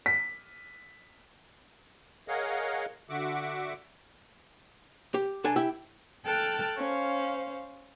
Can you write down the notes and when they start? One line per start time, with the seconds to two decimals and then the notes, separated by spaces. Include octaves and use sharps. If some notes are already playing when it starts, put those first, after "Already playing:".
0.06 B6
2.28 G#4 A#4 C#5 D#5 F5 F#5
3.10 D3 F#4 E5 F#5 D6
5.14 G4
5.44 C2 D4 A4 G#5
5.56 E4 G4 E5
6.25 A4 G5 A5 F6 F#6
6.77 C#4 C5 F5